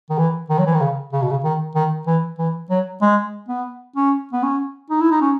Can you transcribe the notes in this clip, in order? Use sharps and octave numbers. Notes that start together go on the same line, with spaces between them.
D#3
E3
D#3
F#3
E3
D#3
C#3
C#3
B2
C#3
D#3
D#3
E3
E3
F#3
G#3
B3
C#4
B3
C#4
D#4
E4
D#4
C#4